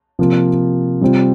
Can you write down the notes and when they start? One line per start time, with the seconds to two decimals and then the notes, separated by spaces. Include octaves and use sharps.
0.19 C3 F3 A#3 F4
1.01 C3 G3 C4 F4